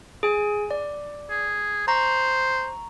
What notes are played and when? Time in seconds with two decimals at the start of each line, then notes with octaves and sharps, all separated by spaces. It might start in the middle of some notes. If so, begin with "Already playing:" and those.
0.23 G#4 G#5
0.71 D5
1.30 G#4
1.88 C5 A#5 C#6